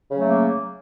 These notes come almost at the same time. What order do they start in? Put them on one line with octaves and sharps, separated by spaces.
C#3 F#3 A3 A#3